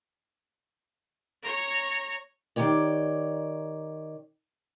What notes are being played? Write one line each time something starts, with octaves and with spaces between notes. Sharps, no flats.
C#5 A#5
D#3 G4 C#5 D5